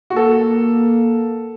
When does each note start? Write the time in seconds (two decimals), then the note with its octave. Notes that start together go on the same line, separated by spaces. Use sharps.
0.10 F#4
0.16 A#3 A4